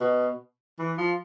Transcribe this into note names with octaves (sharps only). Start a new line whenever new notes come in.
B2
E3
F3